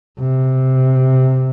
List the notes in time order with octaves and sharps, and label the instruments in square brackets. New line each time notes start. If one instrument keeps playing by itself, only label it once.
[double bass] C3